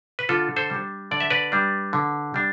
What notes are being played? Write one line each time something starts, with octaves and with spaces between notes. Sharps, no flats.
B4
D3 F4 A4
A4 C5
G3 D4
D3 D5
E5
B4 D5
G3 D4
D3
G3 D4